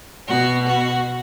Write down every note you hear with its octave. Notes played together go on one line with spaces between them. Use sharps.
B2 F#4
F#4